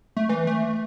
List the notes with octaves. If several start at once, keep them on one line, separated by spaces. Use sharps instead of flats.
A3
E3
A3